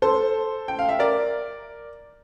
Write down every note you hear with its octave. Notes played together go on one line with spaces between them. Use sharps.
A4 C5
G5
F5
E5
A#4 D5